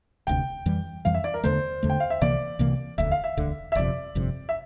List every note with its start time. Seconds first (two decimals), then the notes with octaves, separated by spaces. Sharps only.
0.27 E1 D2 C3 G5
0.66 F2 E3 G3
1.05 F2 E3 G3 F5
1.14 E5
1.24 D5
1.34 A#4
1.44 E2 D3 A3 C5
1.83 E2 D3 A3
1.90 G5
2.00 F5
2.10 E5
2.21 C2 C3 E3 A#3 D5
2.59 C2 C3 E3 A#3
2.98 E1 D2 D3 E5
3.11 F5
3.24 E5
3.37 E1 D2 D3
3.72 E5
3.75 G1 F2 C3 D5
4.15 G1 F2 C3
4.49 E5